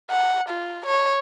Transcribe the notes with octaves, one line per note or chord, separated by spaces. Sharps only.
F#5
F4
C#5